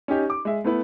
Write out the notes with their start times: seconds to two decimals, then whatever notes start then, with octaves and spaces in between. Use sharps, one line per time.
0.08 C#4 D#4 G4
0.30 D6
0.45 G#3 E5
0.64 A3 B3 E4 B4